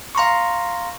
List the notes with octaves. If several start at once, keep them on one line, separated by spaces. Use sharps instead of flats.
F5 A#5 C6 C#6